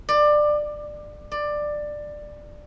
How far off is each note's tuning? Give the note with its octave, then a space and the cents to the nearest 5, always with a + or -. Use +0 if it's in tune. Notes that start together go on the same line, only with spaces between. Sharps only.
D5 +20
D5 +15